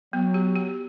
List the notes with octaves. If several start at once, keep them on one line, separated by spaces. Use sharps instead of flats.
F#3 B3
G4
G4